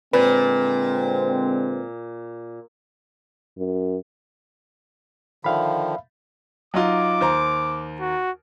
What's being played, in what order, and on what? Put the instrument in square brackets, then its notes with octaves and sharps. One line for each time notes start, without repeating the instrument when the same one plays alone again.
[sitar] A#2 [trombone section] D3 G#3 C4 [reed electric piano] B4
[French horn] F#2
[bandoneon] D3 D#3 F3 [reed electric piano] E5 F5 B5
[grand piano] F#3 D#4 F4 [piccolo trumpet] D6
[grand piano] D#2 C5 A#5
[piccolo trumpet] F#4